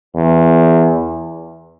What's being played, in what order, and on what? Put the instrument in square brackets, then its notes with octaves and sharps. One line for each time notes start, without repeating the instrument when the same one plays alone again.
[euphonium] E2